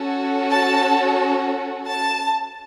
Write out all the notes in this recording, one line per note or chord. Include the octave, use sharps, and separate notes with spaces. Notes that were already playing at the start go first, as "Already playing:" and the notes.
Already playing: C#4 F#4 A4
A5
A5